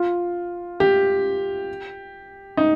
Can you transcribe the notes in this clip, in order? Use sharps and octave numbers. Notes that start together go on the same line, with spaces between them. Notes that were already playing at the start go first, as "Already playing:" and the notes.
Already playing: F4
G4
D#4